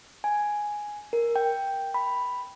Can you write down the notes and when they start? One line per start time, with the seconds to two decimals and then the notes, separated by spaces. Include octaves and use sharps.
0.24 G#5
1.13 A#4
1.36 G5
1.94 B5